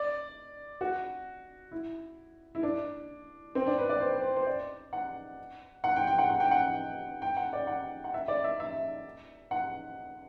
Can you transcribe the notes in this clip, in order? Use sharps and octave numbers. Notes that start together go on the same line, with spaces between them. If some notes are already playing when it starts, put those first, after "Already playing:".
Already playing: D5
F#4
E4
E4
D4
C4
D4
B4
D5
C5
B4
C5
C5
D5
F#5
F#5
G5
G5
F#5
F#5
G5
F#5
G5
F#5
D5
F#5
F#5
E5
D5
E5
E5
F#5